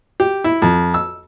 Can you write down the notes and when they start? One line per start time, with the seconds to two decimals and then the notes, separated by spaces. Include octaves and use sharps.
0.20 G4
0.44 E4
0.62 F2
0.94 E6